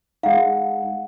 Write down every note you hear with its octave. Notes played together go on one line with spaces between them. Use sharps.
G#3 D#4 F5 F#5